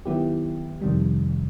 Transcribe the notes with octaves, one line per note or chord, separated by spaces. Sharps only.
D#3 F#3 B3 E4 G4
F2 C3 D#3 G3